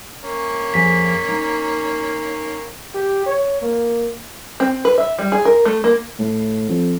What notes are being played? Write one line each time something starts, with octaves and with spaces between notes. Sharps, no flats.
A#3 C#4
F2 G#4 G#5 B6
D#4
G4
C#5
A#3
C4
B4
E5
G3
G#4
A#4
A3
A#3
A2
F2